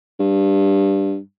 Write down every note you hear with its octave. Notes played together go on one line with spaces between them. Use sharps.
G2